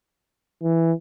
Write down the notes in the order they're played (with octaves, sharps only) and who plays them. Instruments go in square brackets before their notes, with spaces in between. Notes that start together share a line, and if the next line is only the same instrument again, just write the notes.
[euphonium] E3